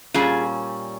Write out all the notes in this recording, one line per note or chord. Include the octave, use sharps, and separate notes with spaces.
A#2 G3 C#4 F4 G#4